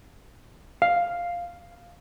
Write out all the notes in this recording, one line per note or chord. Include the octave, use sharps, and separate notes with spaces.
F5